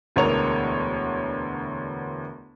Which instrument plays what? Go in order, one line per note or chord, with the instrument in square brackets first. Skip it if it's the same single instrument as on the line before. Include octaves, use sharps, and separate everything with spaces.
[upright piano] E1 D2 E3 A#4 C#5 F7